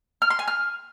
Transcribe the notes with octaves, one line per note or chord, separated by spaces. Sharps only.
F6
C6
G#5
F6